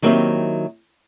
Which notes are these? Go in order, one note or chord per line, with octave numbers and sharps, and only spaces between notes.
D#3 F#3 A#3 C4 E4 G4